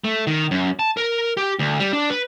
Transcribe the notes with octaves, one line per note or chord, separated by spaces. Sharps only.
A3
D#3
F#2
A5
A#4
G4
D2
G3
D4
B4